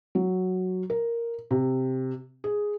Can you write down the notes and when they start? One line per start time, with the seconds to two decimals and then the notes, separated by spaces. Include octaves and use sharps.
0.15 F#3
0.90 A#4
1.51 C3
2.44 G#4